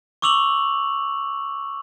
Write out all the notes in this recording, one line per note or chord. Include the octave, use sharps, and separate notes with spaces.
C#6 D6 E6 F7 F#7